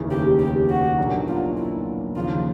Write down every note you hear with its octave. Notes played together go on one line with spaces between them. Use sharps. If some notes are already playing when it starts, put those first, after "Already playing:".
Already playing: F1 D#2 C#3 E3
G4
G4
F#4
B1 A#2 F#3 A#3 D4
F4
E4
D#2 C#3 F3 F4